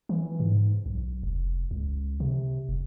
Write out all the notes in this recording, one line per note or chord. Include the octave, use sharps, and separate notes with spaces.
E3
G#2
B1
F1
C#2
C3
F1